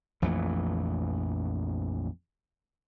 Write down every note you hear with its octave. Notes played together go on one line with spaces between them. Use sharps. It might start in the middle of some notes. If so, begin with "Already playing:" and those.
A#1 F2 E3 A3